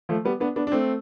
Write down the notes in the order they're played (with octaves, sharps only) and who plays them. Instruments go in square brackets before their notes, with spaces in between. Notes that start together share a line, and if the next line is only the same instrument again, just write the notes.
[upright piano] F3 A3
G3 B3
B3 D4
B3 D4
D4
A3 C4